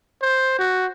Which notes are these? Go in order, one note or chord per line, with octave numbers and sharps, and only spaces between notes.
C5
F#4